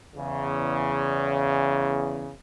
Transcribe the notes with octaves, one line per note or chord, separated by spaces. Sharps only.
E2 C#3